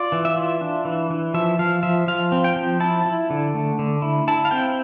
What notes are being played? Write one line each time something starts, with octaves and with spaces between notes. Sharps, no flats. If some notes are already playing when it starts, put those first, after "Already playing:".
Already playing: F4 D5
E3
E5
F4
D4
E3
E3
F3 E5
F3 F5
F3 E5
F3 F5
C4
G5
F3
E4 A5
E4
D3
A3
D3
E4
E4 A5
F5
C4 G5